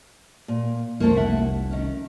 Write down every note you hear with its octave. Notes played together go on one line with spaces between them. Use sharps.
A#2
F1 C2 F3 A3 A#3
E5 F#5
D#3 C#4